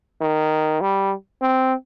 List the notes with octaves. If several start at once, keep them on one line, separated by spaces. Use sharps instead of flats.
D#3
G3
C4